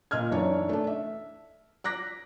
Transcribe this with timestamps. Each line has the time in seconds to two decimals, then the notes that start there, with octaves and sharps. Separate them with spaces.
0.11 A#2 D#5 F6 G#6
0.31 B1 F#2 E3 D4 C#5 D5
0.69 A3 D4
0.87 E5
1.84 D6 F#6 A#6 B6